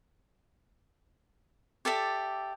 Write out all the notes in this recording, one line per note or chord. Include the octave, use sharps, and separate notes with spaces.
G4 A4 D5 E5